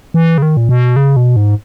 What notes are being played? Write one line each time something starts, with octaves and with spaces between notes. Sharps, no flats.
E3
C#3
D#3
A#2
B2
C#3
B2
G#2